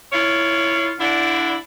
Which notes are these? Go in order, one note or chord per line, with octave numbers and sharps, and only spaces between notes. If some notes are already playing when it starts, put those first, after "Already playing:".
E4 F4 C#5
D3 D4 E4